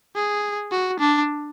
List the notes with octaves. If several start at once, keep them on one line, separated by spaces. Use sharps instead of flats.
G#4
F#4
D4